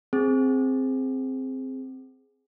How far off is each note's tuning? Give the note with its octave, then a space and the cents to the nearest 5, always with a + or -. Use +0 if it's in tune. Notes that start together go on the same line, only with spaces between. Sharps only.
C4 +0 G#4 +0